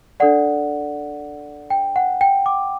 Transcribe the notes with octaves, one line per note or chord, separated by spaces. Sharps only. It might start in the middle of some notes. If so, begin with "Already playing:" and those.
D4 A4 D5 F#5
G5
F#5
G5
D6